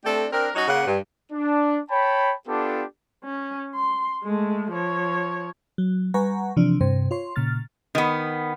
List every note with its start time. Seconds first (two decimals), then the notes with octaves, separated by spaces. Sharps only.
0.05 A3 C4 D4 G4 A4
0.32 C4 D4 A#4
0.55 F#3 C#4 D#4 F#4
0.68 C#3 A#3 C#4 F#5
0.87 G2
1.32 D4
1.90 C#5 G5 A5 B5
2.48 B3 D4 F4 G4 A4
3.24 C#4
3.75 C6
4.23 G#3 A3
4.72 F3 C#5
5.78 F#3
6.14 G3 B4 F#5 G#5 A#5 C#6
6.56 C3 E3 F3 D4
6.81 G2 C3 C5
7.11 F4 C#5 C6
7.36 A#2 C#3 F6 A6
7.95 D#3 B3